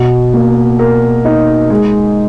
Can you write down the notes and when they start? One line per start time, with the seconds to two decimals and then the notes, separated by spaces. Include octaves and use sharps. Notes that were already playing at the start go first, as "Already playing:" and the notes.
Already playing: B2
0.34 A#3
0.79 A#4
1.25 D#4
1.70 G#3